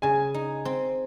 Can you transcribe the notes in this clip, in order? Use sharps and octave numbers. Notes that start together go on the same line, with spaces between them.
C#3 G#5
D#4
C4